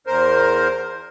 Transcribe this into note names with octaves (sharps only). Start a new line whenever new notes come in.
E2 A#4 C5